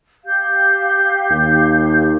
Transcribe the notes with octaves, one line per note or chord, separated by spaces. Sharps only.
G4 F5 G6
D#2